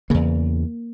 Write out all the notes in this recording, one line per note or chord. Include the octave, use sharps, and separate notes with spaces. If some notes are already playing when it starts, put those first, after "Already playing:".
E2 C#3 A#3